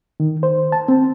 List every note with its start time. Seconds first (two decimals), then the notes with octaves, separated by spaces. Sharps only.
0.20 D#3
0.43 C5
0.72 A5
0.88 C4